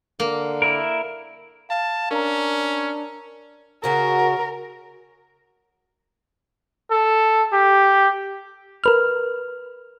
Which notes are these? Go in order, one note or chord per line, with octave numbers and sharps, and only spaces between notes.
D3 A#3
E4 A#4
F5 A5
C#4 D4 A#4 A#5
C#3 F#4 A#4
A4
G4
A#4 B4 F6